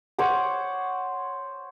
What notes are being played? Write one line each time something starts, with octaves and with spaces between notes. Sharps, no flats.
C5 C#5 F#5 D6